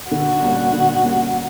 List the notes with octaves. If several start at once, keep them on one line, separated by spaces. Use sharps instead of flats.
D3 F#4
G3 A#3 C#4
D3
G3 A#3 C#4